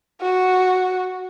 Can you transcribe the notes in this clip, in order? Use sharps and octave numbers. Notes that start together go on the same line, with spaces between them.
F#4